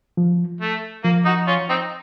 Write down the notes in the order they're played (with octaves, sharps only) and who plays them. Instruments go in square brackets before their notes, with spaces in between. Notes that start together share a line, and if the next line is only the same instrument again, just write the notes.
[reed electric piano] F3
[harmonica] A3
[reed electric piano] F3 [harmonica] A#3
[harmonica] D#4 F#4
C#4 F4
C4 D#4